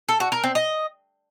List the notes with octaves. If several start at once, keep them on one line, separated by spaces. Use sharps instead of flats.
A4
F#4
A#4
C4
D#5